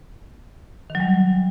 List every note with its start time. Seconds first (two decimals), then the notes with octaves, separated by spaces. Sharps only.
0.90 D#3
0.95 F#3
1.00 G3